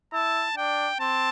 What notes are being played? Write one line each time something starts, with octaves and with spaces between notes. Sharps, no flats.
E4 A5
D4 G5
C4 A5